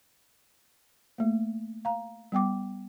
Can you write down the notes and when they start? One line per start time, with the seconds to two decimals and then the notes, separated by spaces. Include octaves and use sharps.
1.18 A3 A#3
1.85 F5 A#5
2.32 G3 B3 G5 D6